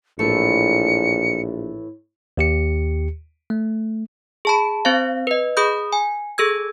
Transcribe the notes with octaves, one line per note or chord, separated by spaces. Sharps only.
A#1 A2 E3 A3 C#7
D#2 G4 C#7
A3
G#4 A5 B5
C4 C5 F5
B4 D#5
G#4 B5 D#6 G6
G#5
G#4 A4 E6 G#6